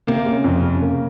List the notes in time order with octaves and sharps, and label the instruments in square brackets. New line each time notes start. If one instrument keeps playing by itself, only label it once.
[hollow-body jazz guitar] C3 [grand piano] A#3
[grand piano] C#3
F2
C#3
A#3